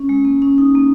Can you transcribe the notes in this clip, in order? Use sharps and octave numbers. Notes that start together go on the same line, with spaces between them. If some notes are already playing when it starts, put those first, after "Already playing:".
Already playing: C#4
G#3
A#3
C#4
D#4
A#3